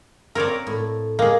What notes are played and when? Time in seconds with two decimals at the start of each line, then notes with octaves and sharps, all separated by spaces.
0.35 C4 F4 A#4 C#5 D5
0.67 A2
1.19 G#3 A#3 G#4